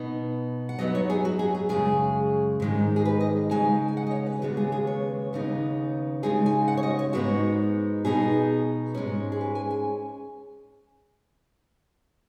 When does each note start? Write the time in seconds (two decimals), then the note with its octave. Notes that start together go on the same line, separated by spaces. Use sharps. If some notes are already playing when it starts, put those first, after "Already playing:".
Already playing: B2 B3 D#4
0.69 F#5
0.78 F#2 F#3 B3 D#4 D#5
0.95 C#5
1.10 G#4
1.25 F#4
1.39 G#4
1.55 G#4
1.69 F#2 C#3 G#3 G#4
2.60 G#2 D#3 G#3 D#4
2.96 G#4
3.05 B4
3.20 D#5
3.51 C#3 G#3 D#4 G#5
3.88 G#5
3.97 F#5
4.07 D#5
4.11 C#5
4.26 B4
4.42 D#2 C#3 G#3 B3 F#4
4.57 G#4
4.72 G#4
4.87 C#5
5.33 D#2 C#3 B3 D#4
6.23 C#3 G#3 D#4 G#4
6.46 G#5
6.68 F#5
6.77 C#5
6.83 D#5
6.99 C#5
7.13 G#2 G#3 B3 D#4 F#4
8.05 B2 B3 D#4 G#4
8.95 G#2 G#3 C#4
9.32 G#4
9.41 B4
9.55 G#5
9.71 G#5